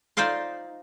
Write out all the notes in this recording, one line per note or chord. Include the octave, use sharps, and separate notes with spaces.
D#4 F4 C5 D5 F5 C6